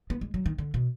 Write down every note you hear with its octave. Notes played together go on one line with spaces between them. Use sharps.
B3
G#3
F#3
D#3
D3
B2